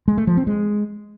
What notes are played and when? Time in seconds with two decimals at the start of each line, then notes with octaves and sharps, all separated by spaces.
0.08 G#3
0.17 A3
0.27 F3
0.37 C4
0.47 G#3